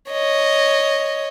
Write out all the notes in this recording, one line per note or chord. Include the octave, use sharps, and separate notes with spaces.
C#5 D#5